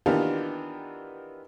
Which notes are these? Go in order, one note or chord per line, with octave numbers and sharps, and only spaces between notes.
D#3 E3 B3 D4 F4 G4